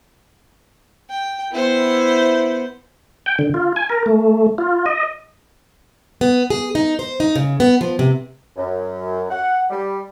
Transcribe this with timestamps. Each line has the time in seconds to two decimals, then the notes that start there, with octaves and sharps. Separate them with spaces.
1.10 G5
1.52 B3 E4 C5
3.26 G5
3.39 D3
3.54 F4
3.76 G#5
3.89 A#4
4.06 A3
4.58 F4
4.86 D#5
6.21 B3
6.50 G#4
6.75 D#4
6.99 C5
7.20 D#4
7.36 C#3
7.60 B3
7.81 F3
7.99 C3
8.56 F#2
9.29 F#5
9.70 G3